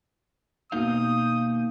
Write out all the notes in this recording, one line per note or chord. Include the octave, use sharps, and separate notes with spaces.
B2 A#3 D#4 F5 D#6 G6